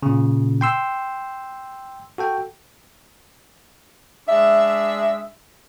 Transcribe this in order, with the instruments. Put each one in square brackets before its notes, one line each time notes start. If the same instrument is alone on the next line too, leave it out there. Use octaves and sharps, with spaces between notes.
[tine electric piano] A#2 C#3
G5 C6 E6
F#4 A4 G5
[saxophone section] G#3 D4 E5